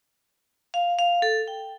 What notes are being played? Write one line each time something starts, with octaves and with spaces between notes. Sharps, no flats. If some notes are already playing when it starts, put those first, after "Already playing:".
F5
F5
A4
G5